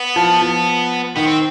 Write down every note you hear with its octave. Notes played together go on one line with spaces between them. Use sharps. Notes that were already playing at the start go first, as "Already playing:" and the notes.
Already playing: B3
F3
F3
D#3 B3
C4